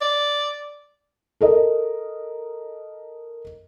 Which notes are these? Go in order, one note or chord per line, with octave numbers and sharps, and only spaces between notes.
D5
A4 A#4 D#5